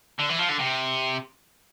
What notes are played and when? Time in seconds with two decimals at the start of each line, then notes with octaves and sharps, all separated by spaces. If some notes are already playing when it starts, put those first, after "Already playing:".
0.19 D3
0.29 E3
0.38 F3
0.49 D3
0.59 C3